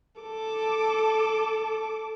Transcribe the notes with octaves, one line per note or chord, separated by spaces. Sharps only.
A4 D6